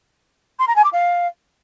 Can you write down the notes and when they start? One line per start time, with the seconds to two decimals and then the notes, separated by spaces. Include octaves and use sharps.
0.59 C6
0.67 A#5
0.76 G#5
0.84 D6
0.92 F5